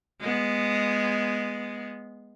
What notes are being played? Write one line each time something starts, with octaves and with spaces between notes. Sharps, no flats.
G#3 B3